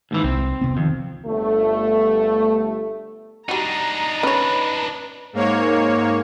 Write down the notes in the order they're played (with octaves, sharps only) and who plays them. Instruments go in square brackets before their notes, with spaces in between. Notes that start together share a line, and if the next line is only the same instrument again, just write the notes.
[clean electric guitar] D#2 G#2 E3
[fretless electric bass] C2 [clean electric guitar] C4
[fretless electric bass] E1 C3 B3
[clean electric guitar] F2 [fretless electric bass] D#3
[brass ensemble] G1 A3
[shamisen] G3 F#4 [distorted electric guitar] D4 D#4 [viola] A#5
[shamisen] C#4 C#5 [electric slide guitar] B4
[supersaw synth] G#2 A#3 C#5